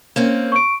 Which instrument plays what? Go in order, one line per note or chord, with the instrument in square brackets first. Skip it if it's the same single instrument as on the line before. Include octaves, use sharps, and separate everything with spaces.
[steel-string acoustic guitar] A#3 C4 C#4
[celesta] C#6 D7